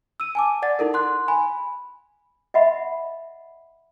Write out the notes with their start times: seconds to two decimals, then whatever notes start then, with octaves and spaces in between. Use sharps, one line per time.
0.20 E6 D#7
0.35 G#5 A5 D6
0.62 D5 F#5 A6
0.79 D#4 E4 A4 A#4
0.93 F#5 C6 F#6
1.28 G#5 B5
2.54 D#5 E5 F#5 B5